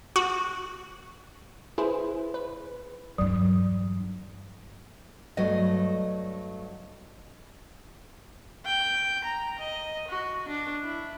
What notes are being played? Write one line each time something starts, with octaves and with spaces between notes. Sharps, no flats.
F#4
E4 G#4 B4 C5
B4
E2 G2 F#3
G2 F#3 A3 D#5
G5
A#5
D#5
F#4
D4
E4